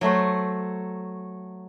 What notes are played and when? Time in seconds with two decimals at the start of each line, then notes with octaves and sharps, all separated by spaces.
0.01 F#3 A3 F#4 C5